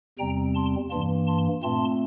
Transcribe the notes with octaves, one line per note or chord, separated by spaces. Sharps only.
E2 C3 G3 C4 G5 A#5
A5 C6
G2 E3 A#3 A5 C6
A5 C6
A#2 A3 C4 A5 C6